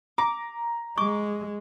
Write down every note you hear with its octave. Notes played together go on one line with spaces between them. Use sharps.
A#5 D6
G#3 C#6 D6